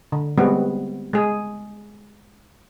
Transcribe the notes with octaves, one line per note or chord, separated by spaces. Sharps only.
D3
G3 G#3 B3 C4 F#4
G#3 G#4